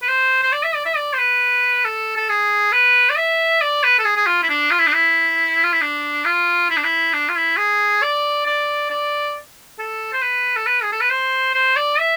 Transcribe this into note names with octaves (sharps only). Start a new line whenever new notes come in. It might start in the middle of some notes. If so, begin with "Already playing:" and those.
B4
C5
C5
D5
E5
D5
E5
D5
C5
B4
A4
A4
G#4
B4
D5
E5
D5
B4
A4
G#4
G#4
F4
E4
D4
F4
E4
D4
E4
F4
E4
D4
F4
E4
D4
E4
D4
F4
E4
G#4
D5
D5
D5
A4
C5
B4
A4
B4
G#4
A4
B4
C5
C5
D5
E5